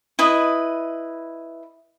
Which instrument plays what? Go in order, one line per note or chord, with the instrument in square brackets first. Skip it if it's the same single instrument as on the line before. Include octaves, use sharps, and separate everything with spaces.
[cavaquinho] E4 B4 D#5